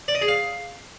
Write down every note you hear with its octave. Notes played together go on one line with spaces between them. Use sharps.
D5
D#5
G#4
F5